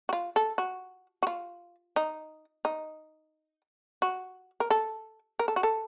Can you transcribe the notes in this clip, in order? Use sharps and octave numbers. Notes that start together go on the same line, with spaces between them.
F#4
F4
A4
F#4
F#4
F4
D#4
D#4
F#4
A#4
A4
A#4
A4
F#4
A4